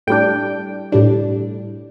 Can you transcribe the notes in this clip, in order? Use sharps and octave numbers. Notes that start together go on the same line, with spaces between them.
A2 G3 D4 G5
A2 G3 D4